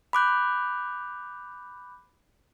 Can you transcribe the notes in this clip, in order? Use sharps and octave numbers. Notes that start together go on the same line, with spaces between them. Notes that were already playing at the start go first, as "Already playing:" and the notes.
B5 D6 F#6 G6